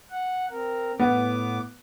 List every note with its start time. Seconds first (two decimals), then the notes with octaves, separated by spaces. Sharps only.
0.11 F#5
0.51 C4 A#4
0.99 A2 B3 D6